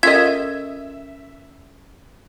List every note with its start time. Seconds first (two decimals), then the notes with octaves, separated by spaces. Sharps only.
0.03 C#4 F4 A4 A#4 C#5 D#5 E5 G#6